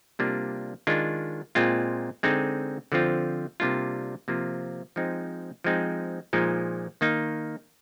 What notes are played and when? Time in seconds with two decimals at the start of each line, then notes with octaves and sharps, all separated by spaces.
0.19 C3 G3 A#3 D4 F4
0.87 D#3 G#3 D4 F4
1.55 A#2 G#3 C4 F4
2.23 D3 G#3 C4 D#4
2.92 D3 F3 C4 F4
3.60 C3 G3 A#3 D4 F4
4.28 C3 F3 A#3 F4
4.96 F3 G#3 C4 D#4
5.64 F3 G#3 C4 D#4
6.33 A#2 F3 G#3 D#4
7.01 D#3 A#3 D#4